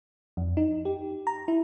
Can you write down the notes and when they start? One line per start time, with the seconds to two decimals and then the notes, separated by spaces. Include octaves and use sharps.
0.37 F2
0.57 D#4
0.85 G4
1.27 A#5
1.48 E4